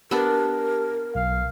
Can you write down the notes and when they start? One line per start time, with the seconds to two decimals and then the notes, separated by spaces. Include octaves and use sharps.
0.11 B3 D4 G4 A#4 A5
1.15 B1 F5